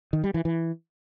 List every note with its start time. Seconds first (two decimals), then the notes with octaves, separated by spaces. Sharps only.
0.13 D#3
0.24 G3
0.34 E3
0.45 E3